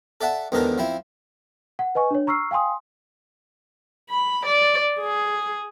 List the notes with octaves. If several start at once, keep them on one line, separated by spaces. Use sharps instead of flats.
A4 D5 E5 F#5 A5
E2 G#2 D3 D#3 A4 A#4
F3 C4 E4
F#5
B4 D#5 G#5 C#6
D4 C#5
A#5 C#6 E6 F6 C7
F5 G5 G#5 C6 D#6
B5
D5
G#4